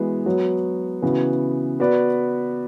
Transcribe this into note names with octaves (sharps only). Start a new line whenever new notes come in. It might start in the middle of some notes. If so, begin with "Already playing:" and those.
Already playing: E3 G#3 B3 F#4
F#3 B3 F#4 C#5
C#3 E3 B3 F#4
B3 F#4 B4 D5